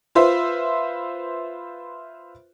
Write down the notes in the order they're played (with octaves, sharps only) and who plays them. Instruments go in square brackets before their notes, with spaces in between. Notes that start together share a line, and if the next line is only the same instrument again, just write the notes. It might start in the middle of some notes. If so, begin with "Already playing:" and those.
[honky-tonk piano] F4 B4 C5 E5